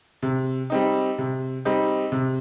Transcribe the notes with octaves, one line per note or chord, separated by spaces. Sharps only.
C3
G3 C4 D#4
C3
G3 C4 D#4
C3